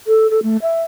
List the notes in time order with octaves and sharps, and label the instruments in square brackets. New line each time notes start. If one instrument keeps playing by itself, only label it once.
[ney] A4
A4
A3
E5